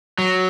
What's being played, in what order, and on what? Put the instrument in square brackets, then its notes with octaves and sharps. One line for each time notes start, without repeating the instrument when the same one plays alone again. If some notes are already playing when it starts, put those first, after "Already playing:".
[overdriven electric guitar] F#3